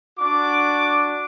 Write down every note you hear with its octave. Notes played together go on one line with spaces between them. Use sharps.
D4 F#4 D6